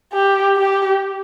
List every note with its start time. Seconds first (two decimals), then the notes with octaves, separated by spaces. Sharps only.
0.14 G4
0.56 G4